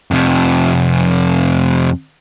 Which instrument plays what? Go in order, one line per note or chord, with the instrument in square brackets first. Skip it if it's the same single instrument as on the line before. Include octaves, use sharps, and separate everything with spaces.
[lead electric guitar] F2 C3